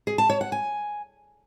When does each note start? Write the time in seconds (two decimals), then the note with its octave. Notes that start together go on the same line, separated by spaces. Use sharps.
0.07 G#4
0.18 A5
0.30 C#5
0.41 F#5
0.52 G#5